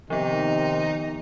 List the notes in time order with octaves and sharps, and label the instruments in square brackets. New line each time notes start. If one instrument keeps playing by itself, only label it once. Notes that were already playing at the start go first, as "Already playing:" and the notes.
[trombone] C3 [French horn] D#3 [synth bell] F3 B3 [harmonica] D#4